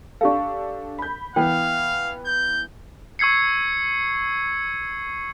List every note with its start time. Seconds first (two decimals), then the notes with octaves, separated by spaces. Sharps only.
0.21 D4 G4 A4 F5 C#6
0.99 B5 G6
1.36 E3 B3 B4 F5 G5
2.26 G6
3.19 C#6 E6 G#6 C7 C#7